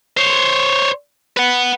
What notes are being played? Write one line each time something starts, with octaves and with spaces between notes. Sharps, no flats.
C5 C#5
B4 F#5